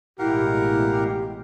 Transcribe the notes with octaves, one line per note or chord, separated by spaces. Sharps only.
A1 B2 G#3 E4 G4 A#4 F5 F#5